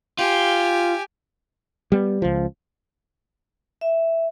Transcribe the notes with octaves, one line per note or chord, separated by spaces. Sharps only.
F4 G4 G#5
G3 B3
C#2 F3
E5